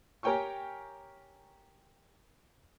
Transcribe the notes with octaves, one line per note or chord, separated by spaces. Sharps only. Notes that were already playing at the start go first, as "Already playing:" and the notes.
G4 A#4 C#5 G5 G#5 C#6